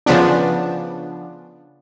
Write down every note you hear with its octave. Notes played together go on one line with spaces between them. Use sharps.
C#3 F3 B3 D4